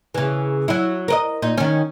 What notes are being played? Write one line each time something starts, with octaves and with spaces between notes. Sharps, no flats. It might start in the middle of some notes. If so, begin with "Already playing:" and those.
C#3 E3
F#3 E4
A#4 B4 D#5
A#2 D#4
D#3 C#4